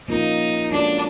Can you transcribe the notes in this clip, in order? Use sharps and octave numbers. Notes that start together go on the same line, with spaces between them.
F3 A#3 C#4 D#4 F4 A#4
G#3 C#4 D4 F#4 A4